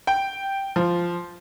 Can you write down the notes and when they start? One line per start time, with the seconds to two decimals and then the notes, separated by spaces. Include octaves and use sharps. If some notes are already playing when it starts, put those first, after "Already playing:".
0.07 G5
0.76 F3